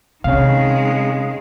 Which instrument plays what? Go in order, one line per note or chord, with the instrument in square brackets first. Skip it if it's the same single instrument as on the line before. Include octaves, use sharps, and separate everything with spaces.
[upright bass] C3 [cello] D#3 G#3 [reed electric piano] C#4 F5